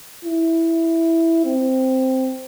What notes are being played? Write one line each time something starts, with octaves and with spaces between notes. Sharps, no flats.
E4
C4